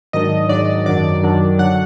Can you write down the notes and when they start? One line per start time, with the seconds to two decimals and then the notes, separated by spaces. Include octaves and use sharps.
0.13 G#2 D#3 F#3 D4 D#5
0.49 G#2 D#3 F#3 D4 D5
0.86 F#2 D#3 F#3 D4 D5
1.22 F#2 D#3 F#3 D4
1.58 D3 F#3 F#5